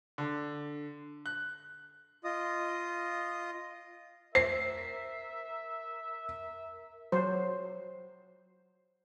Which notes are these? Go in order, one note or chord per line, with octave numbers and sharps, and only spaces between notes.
D3
F#6
F4 D#5 D#6
A#4 C5 E5 C7
F#3 C5